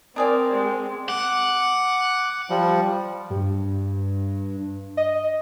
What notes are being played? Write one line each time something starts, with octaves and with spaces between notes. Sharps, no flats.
C4 D4 G#4 A#4 D5
G#3
F#5 D6
F3 G3
G2
D#5